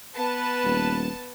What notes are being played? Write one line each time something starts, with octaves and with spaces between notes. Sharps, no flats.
B3 B4 A5
D#1